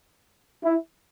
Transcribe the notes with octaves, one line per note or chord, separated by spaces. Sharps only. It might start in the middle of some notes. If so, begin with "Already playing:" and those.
E4